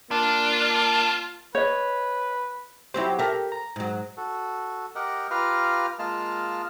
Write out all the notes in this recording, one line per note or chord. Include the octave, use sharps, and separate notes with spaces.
A#3 D4 F4
B4 C#5 D#5
F#3 C4 E4 G4 C5
G4 A4 A#4 E5
A#5
G#2 F#3
F#4 A4
G4 A#4 D#5 F#5
F4 G4 B4 F5 A#5 F6
G#3 A#3 F4 D#5 A5 F6